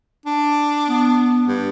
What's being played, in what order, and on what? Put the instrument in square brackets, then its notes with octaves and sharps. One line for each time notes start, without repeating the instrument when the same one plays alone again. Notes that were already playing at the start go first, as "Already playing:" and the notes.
[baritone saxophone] D4
[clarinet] B3
[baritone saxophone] G2